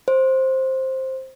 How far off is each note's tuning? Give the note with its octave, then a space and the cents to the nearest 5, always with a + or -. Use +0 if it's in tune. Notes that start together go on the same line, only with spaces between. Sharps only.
C5 +10